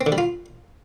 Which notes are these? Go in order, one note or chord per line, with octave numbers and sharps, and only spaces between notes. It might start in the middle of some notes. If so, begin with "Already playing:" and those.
C4
D3
G3
F4